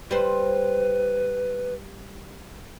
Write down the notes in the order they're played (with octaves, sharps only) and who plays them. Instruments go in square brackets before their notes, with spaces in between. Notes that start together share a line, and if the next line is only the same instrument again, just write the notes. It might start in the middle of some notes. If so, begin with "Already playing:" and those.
[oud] G3 C5 [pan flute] B4